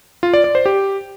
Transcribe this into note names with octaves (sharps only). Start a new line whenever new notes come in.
F4
D5
D5
C5
G4